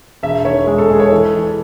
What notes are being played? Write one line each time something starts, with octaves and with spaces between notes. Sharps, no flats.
E1 E5
D#3 C#5
G#3 G#4
A4
G#3 G#4
C#5
E3 A4
E3